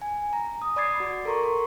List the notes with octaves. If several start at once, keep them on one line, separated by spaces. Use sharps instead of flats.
G#5
A#5
D#6
D5 B5 D6 G#6 A6 C7
F#4 D6
A4 A#4 A#5 C6 C#6